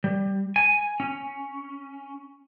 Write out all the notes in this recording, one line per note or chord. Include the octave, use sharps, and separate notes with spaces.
G3
G#5
C#4